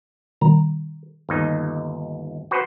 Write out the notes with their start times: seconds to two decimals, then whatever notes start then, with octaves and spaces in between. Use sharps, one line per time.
0.41 B2 D#3 G3 A#5
1.29 G1 D#2 D#4
2.51 F#4 B4 C5